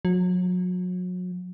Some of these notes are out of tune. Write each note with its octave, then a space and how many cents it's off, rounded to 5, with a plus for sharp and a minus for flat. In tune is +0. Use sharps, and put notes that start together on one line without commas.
F#3 -35